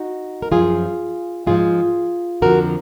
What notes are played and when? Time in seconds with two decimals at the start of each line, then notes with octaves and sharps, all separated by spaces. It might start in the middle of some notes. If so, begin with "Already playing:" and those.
Already playing: D#4 F#4
0.42 A#4
0.52 F#2 F3 F4 G#4
1.47 G#2 F3 F4 G#4
2.42 F2 D3 F3 F#4 A#4